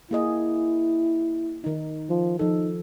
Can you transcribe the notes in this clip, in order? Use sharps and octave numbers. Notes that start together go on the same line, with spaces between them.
A#3 E4 G#4 D#5
D#3 D#4
F3
F3 D#4 A4